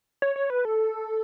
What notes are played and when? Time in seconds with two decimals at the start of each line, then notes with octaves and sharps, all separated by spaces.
0.22 C#5
0.36 C#5
0.50 B4
0.65 A4